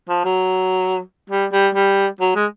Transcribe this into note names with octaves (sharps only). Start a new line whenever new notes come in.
F3
F#3
G3
G3
G3
F#3
G#3